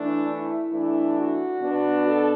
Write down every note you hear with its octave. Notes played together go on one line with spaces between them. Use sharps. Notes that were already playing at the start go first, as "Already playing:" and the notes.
Already playing: E3 A3 D4
E4
E3 A3 D4
F#4
B2 B3 D4
A4